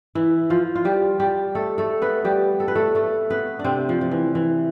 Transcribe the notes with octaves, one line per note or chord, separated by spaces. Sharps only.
E3 E4
F3 F4
F4
G3 G4
G3 G4
A3 A4
A3 A4
B3 B4
G3 G4
A4
B4
A3 A4
A3 A4
B3 B4
D4
C3 C4
F3
F3
E3
E3